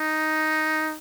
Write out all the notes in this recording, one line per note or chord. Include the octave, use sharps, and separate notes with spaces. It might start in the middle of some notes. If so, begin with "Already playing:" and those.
Already playing: D#4